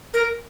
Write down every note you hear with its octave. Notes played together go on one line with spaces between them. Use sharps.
A#4